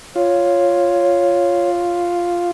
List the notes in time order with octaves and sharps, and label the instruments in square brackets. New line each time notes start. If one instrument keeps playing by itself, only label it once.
[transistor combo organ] F4 [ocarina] C#5